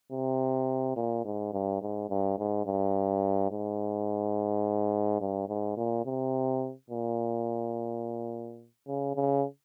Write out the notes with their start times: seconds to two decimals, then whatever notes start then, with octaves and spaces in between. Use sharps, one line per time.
0.12 C3
0.96 A#2
1.25 G#2
1.53 G2
1.82 G#2
2.10 G2
2.39 G#2
2.66 G2
3.51 G#2
5.21 G2
5.49 G#2
5.77 A#2
6.06 C3
6.90 A#2
8.88 C#3
9.16 C#3